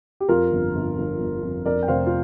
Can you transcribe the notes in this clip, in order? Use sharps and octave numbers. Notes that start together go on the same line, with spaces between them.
G4
F2 F4 A#4
G1
G1
G1
G1
F2
F2 A#4 D5
G5
F1 C5 F5
F4